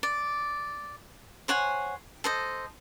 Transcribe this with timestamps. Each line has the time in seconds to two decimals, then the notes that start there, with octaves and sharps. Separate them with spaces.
0.03 D5
1.48 C5 C#5 F#5 G#5
2.24 A4 C5 D#5